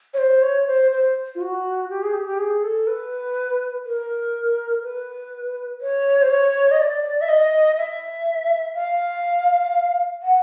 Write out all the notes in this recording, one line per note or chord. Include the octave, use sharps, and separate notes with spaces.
C#5
C5
C#5
C5
C5
F4
F#4
G4
G#4
G4
G4
G#4
A4
B4
A#4
B4
C#5
C5
C#5
D#5
D5
E5
D#5
E5
F5
F#5